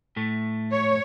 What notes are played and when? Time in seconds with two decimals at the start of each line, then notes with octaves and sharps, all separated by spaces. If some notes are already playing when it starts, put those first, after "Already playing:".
0.16 A2 A3
0.72 C#5